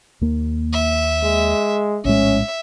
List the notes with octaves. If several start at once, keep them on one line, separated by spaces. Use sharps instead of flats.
D#2 A#3
E5
G#3
A#1 A2 G#3 C#4 E5